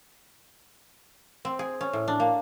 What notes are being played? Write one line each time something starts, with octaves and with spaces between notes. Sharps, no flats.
C4
G#4
C#4
A2
D4
A#3